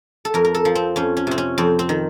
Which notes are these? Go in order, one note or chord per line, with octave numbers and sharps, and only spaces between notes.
A4
F2 A#4
A#4
A4
F3
C4
F2 C#4
C#4
C3 C4
C#4
F2 C4
C4
D#3